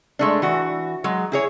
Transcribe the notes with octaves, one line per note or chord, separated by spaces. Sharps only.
G#3 A3 D4
E3 F#4
F#3 G#3
E4 G#4 C#5